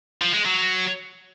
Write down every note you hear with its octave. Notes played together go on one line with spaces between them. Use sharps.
F3
G#3
F#3